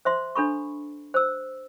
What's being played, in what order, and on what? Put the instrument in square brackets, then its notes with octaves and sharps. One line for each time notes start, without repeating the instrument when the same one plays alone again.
[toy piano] C5 E5 C6
D4 A4 B5 C#6
C5 E6